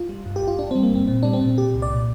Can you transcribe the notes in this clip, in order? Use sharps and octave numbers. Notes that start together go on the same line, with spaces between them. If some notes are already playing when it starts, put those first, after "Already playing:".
Already playing: F4
G3
G2
G4
G1
F4
G1 D4
G3 C4
A#3
G1 C4
A#2 C4
G3 D4
C4
A#2
A#2 G4
C2
D5
A#2